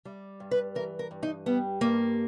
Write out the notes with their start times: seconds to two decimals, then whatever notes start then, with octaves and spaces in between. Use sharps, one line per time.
0.05 G3
0.40 G2
0.51 B4
0.75 E3 A#4
0.99 A#4
1.11 G2
1.23 D#4
1.46 G3 B3
1.81 G2 A#3